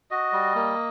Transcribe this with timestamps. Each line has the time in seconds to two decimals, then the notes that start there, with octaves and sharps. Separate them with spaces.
0.11 F#4 D#5
0.33 G3
0.56 A#3